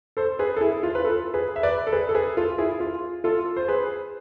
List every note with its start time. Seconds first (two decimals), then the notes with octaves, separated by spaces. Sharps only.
0.17 A4 C5
0.39 G#4 B4
0.57 A4
0.61 E4 G#4
0.83 F4
0.95 B4
1.05 F4 A4
1.34 G#4 B4
1.56 E5
1.63 B4 D5
1.87 A4
1.92 G#4 B4
2.09 A4
2.15 G#4 B4
2.37 F4 A4
2.58 E4 G#4
2.80 F4
3.24 F4 A4
3.57 C5
3.68 G#4 B4